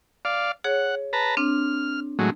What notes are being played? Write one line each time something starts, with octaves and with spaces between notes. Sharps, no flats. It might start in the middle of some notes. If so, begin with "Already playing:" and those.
D5 F5
G#4 C#5 F#5
B4 A5 A#5
C4 D4 F6
A2 F#3 G#3